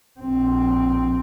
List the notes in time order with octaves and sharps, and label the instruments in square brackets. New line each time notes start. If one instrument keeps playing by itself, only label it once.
[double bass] A#1 C4